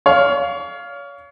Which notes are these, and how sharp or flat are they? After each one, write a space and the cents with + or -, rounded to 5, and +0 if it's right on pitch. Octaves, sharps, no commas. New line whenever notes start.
C#5 +35 F5 +0